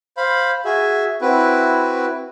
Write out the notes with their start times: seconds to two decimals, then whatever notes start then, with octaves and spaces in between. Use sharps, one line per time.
0.17 C5 F5 B5
0.65 F#4 G#4 E5
1.21 C4 E4 F#4 B4